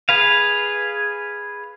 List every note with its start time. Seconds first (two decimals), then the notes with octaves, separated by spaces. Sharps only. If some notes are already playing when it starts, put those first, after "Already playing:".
0.09 G#4 B4 F5